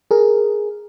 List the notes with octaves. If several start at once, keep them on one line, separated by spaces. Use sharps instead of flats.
G#4 A#4